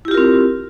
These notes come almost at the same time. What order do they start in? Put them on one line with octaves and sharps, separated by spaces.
E4 G4 F4 A#4 C4